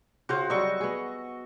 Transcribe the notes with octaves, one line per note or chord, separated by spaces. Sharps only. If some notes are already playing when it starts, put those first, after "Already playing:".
C#3 C4 F4 F#4 C5
F#3 G3 D#5 C#6 E6
B3 G#4